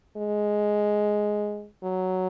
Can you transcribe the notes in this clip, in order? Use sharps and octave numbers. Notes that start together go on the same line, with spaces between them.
G#3
F#3